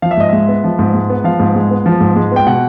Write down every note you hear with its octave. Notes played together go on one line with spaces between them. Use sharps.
F3 F5
E5
G#2 D#5
G#3 E5
B3
F3
G#2
G#3
B3
F3 F5
G#2
G#3
B3
F3
G#2
G#3
B3 G5
B2 F#5